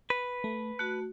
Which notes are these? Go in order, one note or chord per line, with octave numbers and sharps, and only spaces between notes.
B4
A3
A3 F#4 F#6